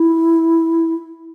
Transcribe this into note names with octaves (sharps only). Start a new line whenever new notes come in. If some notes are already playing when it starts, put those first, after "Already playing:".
Already playing: E4